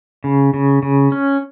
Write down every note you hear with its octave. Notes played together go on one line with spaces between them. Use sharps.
C#3
C#3
C#3
C#4